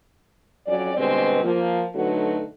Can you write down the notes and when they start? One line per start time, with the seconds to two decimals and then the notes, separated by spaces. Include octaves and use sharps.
0.67 F2 F#3 C#4 D5
0.97 B2 D3 G3 G#3 C4 B4
1.43 F3 A#3
1.95 D3 F#3 A3 D#4 F#4 B4